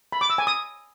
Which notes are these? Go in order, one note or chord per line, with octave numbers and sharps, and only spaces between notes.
B5
D6
E6
G#5
D#6